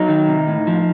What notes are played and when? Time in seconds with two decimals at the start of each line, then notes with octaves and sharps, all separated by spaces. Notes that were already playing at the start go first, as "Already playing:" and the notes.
Already playing: F#3 D#4
0.09 D#3
0.28 C3
0.48 A2
0.67 F3